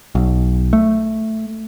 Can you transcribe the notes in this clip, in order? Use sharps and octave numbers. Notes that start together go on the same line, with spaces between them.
B1
A3